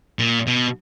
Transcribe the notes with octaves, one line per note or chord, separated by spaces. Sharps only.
A#2
B2